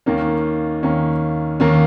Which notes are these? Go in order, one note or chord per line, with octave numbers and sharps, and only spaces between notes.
D#2 D#3 A#3 C#4
D#2 D#3 A#3 C#4
D#2 D#3 A#3 C#4